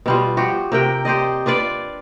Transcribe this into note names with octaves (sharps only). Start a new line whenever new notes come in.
B2 G3 F4
F3 F#4 G4
C3 A#4 G5
G4 C5 D5 D#5
D4 F4 B4 D5